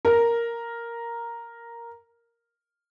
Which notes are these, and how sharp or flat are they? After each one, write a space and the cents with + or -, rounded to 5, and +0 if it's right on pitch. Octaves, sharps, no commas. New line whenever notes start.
A#4 +0